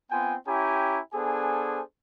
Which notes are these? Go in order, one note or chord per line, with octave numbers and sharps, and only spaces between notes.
B3 C4 F4 G5 G#5
C#4 E4 G4 G5 G#5 A#5
B3 D4 G#4 A4 C5 G#5